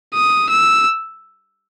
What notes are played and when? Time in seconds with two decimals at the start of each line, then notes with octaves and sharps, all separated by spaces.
0.14 D#6
0.49 E6